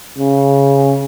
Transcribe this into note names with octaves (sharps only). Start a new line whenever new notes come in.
C#3